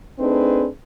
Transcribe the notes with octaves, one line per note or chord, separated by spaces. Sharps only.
A3 C4 D4 D#4 G#4 B4